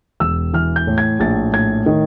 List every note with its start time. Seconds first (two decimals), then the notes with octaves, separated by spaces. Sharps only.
0.20 E1 E6
0.54 E3 F6
0.76 G6
0.87 A2
0.98 G#6
1.19 A#1 A6
1.53 A2 G#6
1.86 D#3